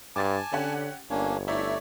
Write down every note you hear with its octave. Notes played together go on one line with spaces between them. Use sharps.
G2 G#5 A5 D6 A6
D3 C#4 G4 F#5
G1 A#3 C#4 D4 C#5
A3 D#4 E4 C#5 D5 E5